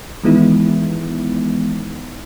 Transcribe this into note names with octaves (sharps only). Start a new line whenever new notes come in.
D#3 E3 G#3 B3 D#4 E4